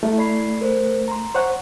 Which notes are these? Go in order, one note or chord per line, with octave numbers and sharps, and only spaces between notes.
A3 E4
D5 B5 C7
A#4 C5
A#5 C6
C5 C#5 F#5